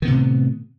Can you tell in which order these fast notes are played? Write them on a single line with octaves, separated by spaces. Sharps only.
D#3 B3 C3 A2